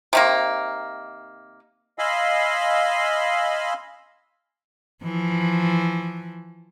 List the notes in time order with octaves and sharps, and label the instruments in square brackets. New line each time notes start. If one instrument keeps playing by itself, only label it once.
[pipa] C3 D#3 A#3
[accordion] D#5 F5 G#5 B5 C6 E6
[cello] E3 F3